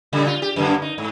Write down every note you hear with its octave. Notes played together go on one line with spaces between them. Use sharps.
A#2 C#3 G3
F4
G4
F#2 D3 A#3
D#4
G#2